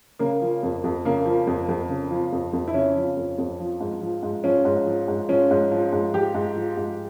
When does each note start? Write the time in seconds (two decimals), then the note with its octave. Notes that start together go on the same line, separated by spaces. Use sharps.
0.19 C#3 A#3
0.42 F3
0.63 F2
0.84 F2
1.05 C#3 A#3
1.26 F3
1.47 F2
1.69 F2
1.89 C#3
2.11 F3
2.32 F2
2.53 F2
2.68 E4
2.74 C#3 C#4
2.96 F3
3.17 F2
3.38 F2
3.60 F3
3.80 G#2
4.01 F3
4.23 G#2
4.44 F3 C#4
4.65 G#2
4.86 F3
5.08 G#2
5.28 F3 C#4
5.51 G#2
5.72 F3
5.92 G#2
6.14 F3 G4
6.34 G#2
6.56 F3
6.77 G#2